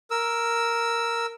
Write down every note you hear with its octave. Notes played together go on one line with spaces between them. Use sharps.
A#4 E6